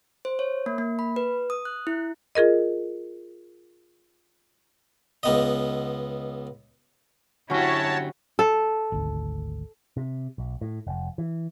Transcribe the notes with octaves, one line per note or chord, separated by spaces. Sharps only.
C5
C#5
A#3
A#3
B5
B4
D#6
F#6
E4
F4 G#4 A#4 D#5
C#2 B3 D#5
D3 F#3 C#4 E4 F#4 G4 C#5 A5
A4
G#1 D2
C3
B1
A2
F1
E3